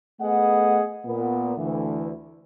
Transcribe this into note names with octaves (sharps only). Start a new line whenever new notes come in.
A3 B3 G#4 D#5 F#5
A#2 B3
D2 E3